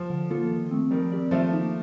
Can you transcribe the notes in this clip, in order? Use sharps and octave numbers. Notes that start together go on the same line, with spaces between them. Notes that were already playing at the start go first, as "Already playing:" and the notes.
Already playing: F3
D3
F3 A#3 F4 A4
D#3
A3 C4
D#3 F3 G3
C4 G4 D5
D#3 F3 A3
A#3 D#4